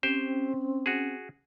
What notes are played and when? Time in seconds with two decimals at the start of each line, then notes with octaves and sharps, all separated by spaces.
0.03 C4 C#4 G4 C5
0.86 F#4 G#4